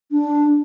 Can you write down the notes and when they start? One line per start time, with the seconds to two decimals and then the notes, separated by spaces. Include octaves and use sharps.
0.12 D4